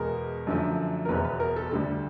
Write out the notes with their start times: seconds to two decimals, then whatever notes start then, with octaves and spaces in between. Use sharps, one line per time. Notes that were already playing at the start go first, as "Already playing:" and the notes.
Already playing: E2 B2 G#3 A#4
0.47 F#2 D3 F3 A3
1.05 A#4
1.09 F#1 E2 B2 F#3 B4
1.25 B4
1.40 A#4
1.56 A4
1.71 D2 D3 G3 A4